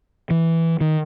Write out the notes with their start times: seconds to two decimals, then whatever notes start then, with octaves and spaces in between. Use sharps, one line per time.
0.30 E3
0.81 D#3